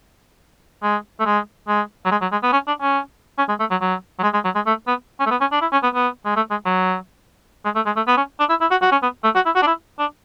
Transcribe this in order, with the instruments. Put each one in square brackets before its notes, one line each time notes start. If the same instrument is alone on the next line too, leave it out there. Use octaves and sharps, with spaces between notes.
[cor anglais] G#3
A3
G#3
G#3
F#3
G#3
F#3
G#3
B3
C#4
D4
C#4
C#4
G#3
A3
F#3
F#3
F#3
G#3
G#3
F#3
G#3
A3
B3
C#4
A3
B3
C#4
D4
E4
C#4
B3
B3
G#3
A3
G#3
F#3
G#3
A3
G#3
A3
B3
C#4
D4
E4
E4
F#4
F#4
C#4
B3
A3
F#4
E4
F#4
D4
E4
D4